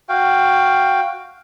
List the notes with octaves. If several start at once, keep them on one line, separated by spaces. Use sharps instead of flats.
F#4 F5 G5